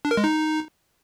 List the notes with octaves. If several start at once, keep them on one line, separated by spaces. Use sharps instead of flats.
D4
A#4
G#3
D#4